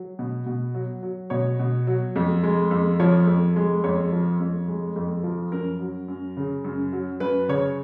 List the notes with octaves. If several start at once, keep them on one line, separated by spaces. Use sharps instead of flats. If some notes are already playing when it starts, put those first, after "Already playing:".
Already playing: F#3
B2
B2
F#3
F#3
B2 C#5
B2
F#3
F2
G#3
F2
F3 C#5
F2
G#3
F2 C#5
F3
F2
G#3
F2
F3
F#2 A#4
F#3
F#2
C#3
F#2
F#3
F#2 B4
C#3 C#5